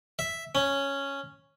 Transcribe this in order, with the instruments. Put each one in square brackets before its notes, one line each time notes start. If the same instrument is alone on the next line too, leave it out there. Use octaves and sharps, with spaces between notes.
[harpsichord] E5
C#4